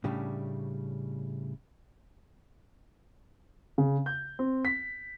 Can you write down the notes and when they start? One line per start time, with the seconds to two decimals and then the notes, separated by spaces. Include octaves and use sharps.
0.04 A2 C#3 G3 D4
3.78 C#3
4.06 G6
4.39 C4
4.65 B6